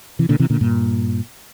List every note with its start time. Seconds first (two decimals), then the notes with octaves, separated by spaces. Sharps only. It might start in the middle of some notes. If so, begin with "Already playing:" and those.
0.19 C3 E3
0.29 A#2 D3
0.39 C3 E3
0.50 A#2 D3
0.61 G2 A#2